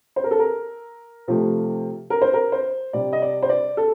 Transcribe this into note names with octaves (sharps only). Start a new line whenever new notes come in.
C5
A#4
A4
A#4
C3 F3 A3
A#4
C5
A#4
C5
C3 G3 D5
D#5
D5
C5
D5
A4